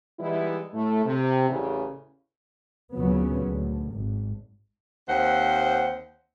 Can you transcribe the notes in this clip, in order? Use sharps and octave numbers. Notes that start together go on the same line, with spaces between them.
E3 G3 G#3 B3 D#4 E4
A2 A3
C3
A1 E2 C#3
D2 A#2 C#3 F#3 B3 C#4
D2
G#1
D#2 C4 C5 F#5